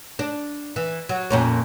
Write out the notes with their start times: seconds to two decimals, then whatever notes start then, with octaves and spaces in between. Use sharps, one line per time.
0.19 D4
0.76 E3
1.09 F#3
1.30 F2 A#2 C#4